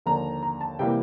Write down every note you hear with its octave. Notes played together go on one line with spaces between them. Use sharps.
D#2 D3 F3 A#5
A#5
A5
C3 E3 G3 A#3 G5